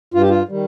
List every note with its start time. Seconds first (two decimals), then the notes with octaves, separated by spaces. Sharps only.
0.14 G2 F4
0.22 G4
0.30 F4
0.49 D#3 G3